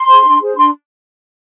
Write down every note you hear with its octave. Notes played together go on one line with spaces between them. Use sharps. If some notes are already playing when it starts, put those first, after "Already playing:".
Already playing: C6
G#4 C5
D4
G#4 C5
D4 C6